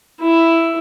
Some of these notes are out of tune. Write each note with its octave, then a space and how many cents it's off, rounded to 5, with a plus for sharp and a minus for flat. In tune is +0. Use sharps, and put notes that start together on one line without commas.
E4 +5